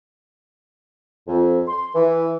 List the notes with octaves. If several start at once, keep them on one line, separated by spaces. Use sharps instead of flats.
F2
C6
E3